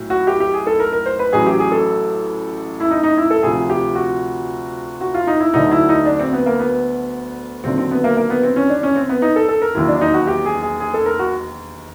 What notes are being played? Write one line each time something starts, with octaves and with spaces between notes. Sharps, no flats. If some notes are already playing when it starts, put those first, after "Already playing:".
Already playing: B1 A2 F#3
F#4
G4
G4
G#4
A4
A#4
A#4
C5
B4
A1 A2 F#3 G#4
G4
G#4
A4
E4
D#4
D#4
E4
A4
D2 C3 F3 G#4
G4
F#4
F#4
F4
D#4
E4
D2 D3 F#3 D#4
E4
D#4
D4
C4
B3
A#3
B3
D#2 D3 F#3 C4
C4
B3
A#3
A#3
B3
C4
C#4
D4
C#4
C4
B3
D#4
A4
A4
A#4
E1 D#2 D#3 F#3 E4
D4
D#4
F#4
G4
G#4
G#4
G#4
A4
A#4
F#4